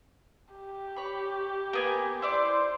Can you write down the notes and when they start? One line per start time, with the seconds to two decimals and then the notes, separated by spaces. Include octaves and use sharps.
0.54 G4
0.96 C#5 B5
1.73 A#3 B3 G#5
2.22 E4 C5 D5 D6